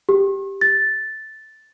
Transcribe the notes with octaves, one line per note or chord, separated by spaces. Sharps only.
G4
A6